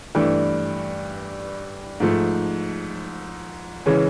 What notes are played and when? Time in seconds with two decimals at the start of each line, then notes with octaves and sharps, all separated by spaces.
0.15 G2 E3 A3 D4
2.00 G#2 F3 A3
3.86 C#3 E3 G#3 C#4